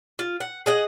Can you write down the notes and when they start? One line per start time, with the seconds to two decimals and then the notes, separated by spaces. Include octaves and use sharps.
0.19 F4
0.40 F#5
0.66 G#4 D#5 F#5